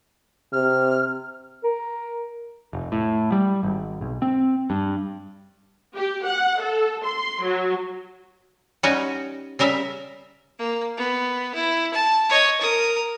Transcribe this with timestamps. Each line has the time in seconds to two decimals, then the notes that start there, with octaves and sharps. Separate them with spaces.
0.53 C3 F6
1.64 A#4
2.73 F1
2.92 A2
3.32 G3
3.63 G#1
4.01 B1
4.22 C4
4.70 G2
5.96 G4
6.27 F#5
6.62 A4
7.06 C6
7.44 F#3
8.83 G3 C#4 D#4 F#4 D#5 G5
9.59 C#3 G3 A#4 E5
10.59 A#3
10.97 B3
11.55 E4
11.93 A5
12.30 C#5 D#5
12.61 A#4 D#6